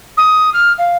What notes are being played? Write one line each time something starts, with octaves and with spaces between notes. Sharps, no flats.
D#6
F6
F5